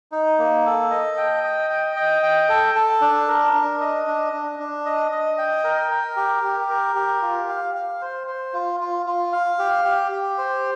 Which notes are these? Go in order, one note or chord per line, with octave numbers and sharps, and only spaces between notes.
D#4
A#3
A4
D#5
G5
D#5
G5
D#5
G5
A4
A4
D4
A#4
D4
D#5
D4
D4
D4
D#5
D#5
G5
A#4
A#4
G4
G4
A#4
G4
F4
F5
F5
C5
C5
F4
F4
F4
F5
G4
G4
G4
C5